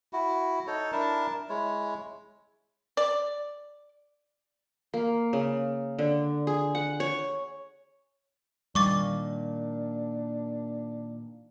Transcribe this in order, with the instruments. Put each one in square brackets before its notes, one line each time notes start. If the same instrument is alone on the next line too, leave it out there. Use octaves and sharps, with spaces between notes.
[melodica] E4 F#4
D#4 A4 C#5
D4 E4 A#4 A5
G#3 E4 C#5
[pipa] D5
[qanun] A#3
C#3
D3
G#4
F#5
C#5
[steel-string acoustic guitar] A#2 D#3 [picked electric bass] G3 [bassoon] D4 [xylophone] C#6 D6 A6